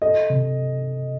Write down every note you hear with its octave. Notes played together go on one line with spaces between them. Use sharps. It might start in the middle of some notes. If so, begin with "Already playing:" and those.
A4 D#5
C3